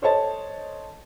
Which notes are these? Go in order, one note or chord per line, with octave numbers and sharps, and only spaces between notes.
A4 C5 C#5 D#5 A5